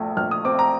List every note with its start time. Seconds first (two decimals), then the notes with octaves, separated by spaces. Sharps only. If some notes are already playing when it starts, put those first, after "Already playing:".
Already playing: A#1 A#2 A3
0.17 A#1 F6
0.31 D#6
0.45 C4 D6
0.59 A#5